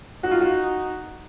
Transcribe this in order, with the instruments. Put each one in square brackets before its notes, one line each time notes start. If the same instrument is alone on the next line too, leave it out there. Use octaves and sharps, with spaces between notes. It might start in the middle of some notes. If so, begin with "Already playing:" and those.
[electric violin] D#4 [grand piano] F#4
[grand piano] F4
F#4